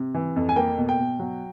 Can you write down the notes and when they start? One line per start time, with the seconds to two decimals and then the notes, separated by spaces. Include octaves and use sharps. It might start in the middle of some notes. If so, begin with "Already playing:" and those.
Already playing: C3
0.14 E3
0.36 F2
0.49 G#5
0.56 A#3 G5
0.78 B2
0.89 G5
0.99 B2
1.20 F#3